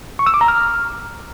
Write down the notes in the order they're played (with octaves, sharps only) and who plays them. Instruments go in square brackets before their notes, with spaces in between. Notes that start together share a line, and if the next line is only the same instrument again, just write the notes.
[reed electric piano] C#6
E6
D6
A#5
F6